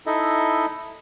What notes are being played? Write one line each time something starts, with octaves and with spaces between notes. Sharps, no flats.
D#4 E4 A4 D#5 E5